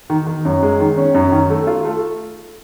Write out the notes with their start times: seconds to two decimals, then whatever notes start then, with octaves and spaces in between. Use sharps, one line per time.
0.10 D#3
0.27 D#3
0.45 F#2
0.63 G#3
0.80 D#3
0.97 C#4
1.14 F#2
1.32 D#3
1.50 A3
1.67 F4
1.85 A3